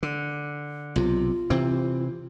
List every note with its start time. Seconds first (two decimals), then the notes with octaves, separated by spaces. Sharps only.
0.03 D3
0.96 B1 C3 F4
1.50 C3 E3 C4